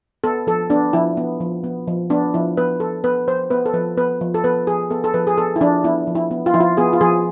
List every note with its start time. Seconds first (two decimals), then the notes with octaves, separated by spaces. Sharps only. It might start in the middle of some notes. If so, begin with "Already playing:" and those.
0.24 B3 A4
0.47 F3 A4
0.70 B3 D4
0.93 F3 E4
1.17 B3
1.40 F3
1.64 B3
1.88 F3
2.10 B3 D4
2.34 F3 E4
2.57 B3 B4
2.80 F3 A4
3.04 B3 B4
3.27 F3 C5
3.50 B3 B4
3.66 A4
3.73 F3 B4
3.97 B3 B4
4.21 F3
4.34 A4
4.44 B3 B4
4.67 F3 G#4
4.90 B3 A4
5.04 A4
5.14 F3 B4
5.27 G#4
5.37 B3 A4
5.56 E4
5.61 F3 D4
5.84 B3 E4
6.07 F3
6.15 E4
6.31 B3
6.46 F4
6.54 F3 E4
6.60 F4
6.77 B3 G#4
6.93 F4
7.01 F3 G#4